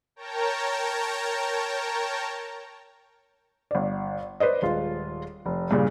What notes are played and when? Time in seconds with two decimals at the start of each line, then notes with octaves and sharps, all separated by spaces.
0.16 A#4 C#5 G5 A5 A#5
3.71 G1 D5
4.40 B4 C5 D5 D#5
4.62 D#1 G#3 F4
5.46 F1
5.71 G2 A#2 C#3